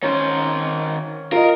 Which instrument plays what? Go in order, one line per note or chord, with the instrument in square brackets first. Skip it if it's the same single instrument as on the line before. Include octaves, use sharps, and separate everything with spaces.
[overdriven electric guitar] D#3 C5 [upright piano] C#4
[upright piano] F4 D#5 [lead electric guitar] A#4